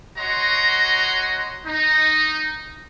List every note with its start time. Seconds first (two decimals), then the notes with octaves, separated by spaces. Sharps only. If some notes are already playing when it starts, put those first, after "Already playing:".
0.18 F#4 C#5 D#5 F#5 A#5 C6
1.66 D#4